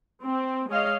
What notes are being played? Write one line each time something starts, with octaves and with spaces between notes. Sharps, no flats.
C4
G#3 C#5 D#5 F5